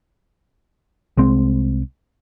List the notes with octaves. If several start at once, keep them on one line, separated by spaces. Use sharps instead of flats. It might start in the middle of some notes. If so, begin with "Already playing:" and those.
C2 G#3 C4